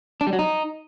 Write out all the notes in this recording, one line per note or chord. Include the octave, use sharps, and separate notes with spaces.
D4
G3
F#3
D#4